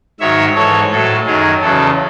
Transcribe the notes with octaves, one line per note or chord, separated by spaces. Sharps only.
G#2 D#3 F#3 C#5 E5
G#2 E3 A4 C#5
A2 F#3 A4
F#2 D#3 F#3 G#4
E2 C#3 F#3 A4